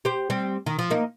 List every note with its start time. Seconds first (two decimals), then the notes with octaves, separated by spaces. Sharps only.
0.05 G4 C5
0.30 G3 C4
0.66 D#3
0.79 F3
0.90 A#3 D#4